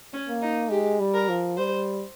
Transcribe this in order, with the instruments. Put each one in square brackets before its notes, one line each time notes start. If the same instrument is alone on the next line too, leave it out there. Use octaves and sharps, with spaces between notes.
[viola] C#4
[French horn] A#3
[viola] D#4
[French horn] G#3 [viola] G4
[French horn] G3
[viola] A#4
[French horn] F3
[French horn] G3 [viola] C5